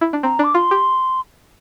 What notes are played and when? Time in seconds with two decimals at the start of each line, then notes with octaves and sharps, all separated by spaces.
0.01 E4
0.13 D4
0.23 C4 A#5
0.39 D4 D6
0.55 F4 C6
0.71 G4